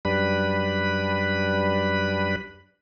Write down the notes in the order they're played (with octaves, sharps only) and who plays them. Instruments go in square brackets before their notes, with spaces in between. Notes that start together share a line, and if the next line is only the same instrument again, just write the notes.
[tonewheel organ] F#2 G3 D4 B4 B5